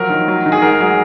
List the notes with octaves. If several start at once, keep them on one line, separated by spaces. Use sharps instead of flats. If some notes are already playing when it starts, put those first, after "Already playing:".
Already playing: F3 F#3 A#4
D#3
F#3
D#3
G#4
G#2 A#4
F#3 G#4